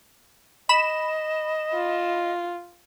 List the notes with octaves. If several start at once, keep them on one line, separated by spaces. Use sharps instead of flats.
D#5 B5 E7
F4